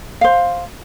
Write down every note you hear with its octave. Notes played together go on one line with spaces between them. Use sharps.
C5 F5